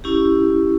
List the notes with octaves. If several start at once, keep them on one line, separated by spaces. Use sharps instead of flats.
C#4 E4 G4